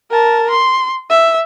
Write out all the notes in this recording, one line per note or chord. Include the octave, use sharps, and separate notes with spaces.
A#4 A5
C6
E5